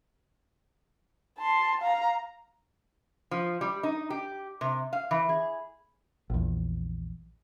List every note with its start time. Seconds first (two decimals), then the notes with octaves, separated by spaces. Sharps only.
1.38 A5 C6
1.81 F5 A#5
3.31 F3
3.61 G3
3.83 D#4
4.10 G4
4.61 C3
4.93 F5
5.11 E3
5.29 G#4
6.30 A#1 E2